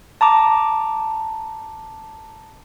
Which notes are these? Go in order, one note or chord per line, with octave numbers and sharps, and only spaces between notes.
A5 A#5 D6